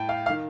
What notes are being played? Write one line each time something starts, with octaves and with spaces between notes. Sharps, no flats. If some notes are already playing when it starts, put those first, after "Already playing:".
Already playing: A2 G5 A5
F5
F5
D#3